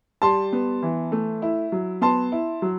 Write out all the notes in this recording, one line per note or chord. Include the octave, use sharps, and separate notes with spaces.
G3 A5 C6
B3
E3
A3
E4
F#3
B3 A5 C6
E4
F#3